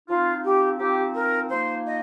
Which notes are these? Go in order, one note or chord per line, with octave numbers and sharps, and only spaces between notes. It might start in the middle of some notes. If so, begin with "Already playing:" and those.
F3 C4 D#4 F4
G4
F3 C4 D#4 G4
A#4
F3 A#3 D#4 C5
D#5